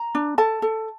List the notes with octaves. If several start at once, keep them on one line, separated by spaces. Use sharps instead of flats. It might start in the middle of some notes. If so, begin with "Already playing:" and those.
Already playing: A#5
D4
A4 A5
A4